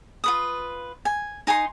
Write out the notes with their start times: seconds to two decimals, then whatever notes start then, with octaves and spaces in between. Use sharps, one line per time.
0.24 F4 B4 D#6
1.05 G#5
1.47 D#4 G#5 A#5 C6